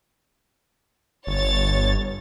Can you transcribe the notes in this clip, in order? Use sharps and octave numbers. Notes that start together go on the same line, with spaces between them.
G1 C#5 A6